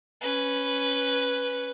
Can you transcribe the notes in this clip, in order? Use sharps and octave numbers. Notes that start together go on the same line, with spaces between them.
C#4 B4